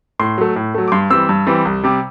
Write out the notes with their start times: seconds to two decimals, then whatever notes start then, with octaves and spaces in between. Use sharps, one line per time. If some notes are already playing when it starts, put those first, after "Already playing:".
0.19 A2 C6
0.38 F#3 A3
0.56 A2
0.74 F#3 A3
0.88 D6
0.92 G2 C6
1.10 E3 G3 C4 E6
1.29 G2
1.47 E3 G3 C4
1.65 C2
1.84 C3 G3